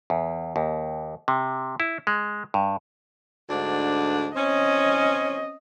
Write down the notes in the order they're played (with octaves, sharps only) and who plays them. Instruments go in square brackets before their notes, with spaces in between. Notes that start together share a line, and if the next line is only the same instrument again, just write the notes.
[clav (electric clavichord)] E2
D#2
C3
E4
G#3
G2
[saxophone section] D2 G#2 D4
[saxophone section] C4 C#4 [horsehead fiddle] D#5